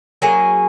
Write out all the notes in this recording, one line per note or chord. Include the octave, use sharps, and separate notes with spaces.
F#3 A#3 C#4 G#4